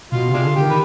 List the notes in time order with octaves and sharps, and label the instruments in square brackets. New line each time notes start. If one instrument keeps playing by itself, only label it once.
[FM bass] B2 [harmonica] F4
[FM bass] C3 [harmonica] G#3 D4 F4
[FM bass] D3
[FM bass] D3 [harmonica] G4
[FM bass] D#3
[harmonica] B4